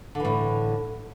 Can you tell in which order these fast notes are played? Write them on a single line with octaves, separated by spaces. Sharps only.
D3 E3 A2